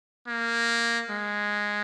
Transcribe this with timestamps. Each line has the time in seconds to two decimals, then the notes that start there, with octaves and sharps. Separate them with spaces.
0.28 A#3
1.10 G#3